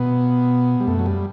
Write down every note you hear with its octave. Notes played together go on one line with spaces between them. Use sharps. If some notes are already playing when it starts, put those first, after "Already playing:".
Already playing: B2 B3
G3
F#2 A3
F#3
G3